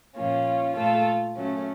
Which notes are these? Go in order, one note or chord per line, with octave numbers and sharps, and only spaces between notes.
A#2 F3 A#3 C#4 F4
A#2 A3 F4 A4
C#3 F#3 A3 C#4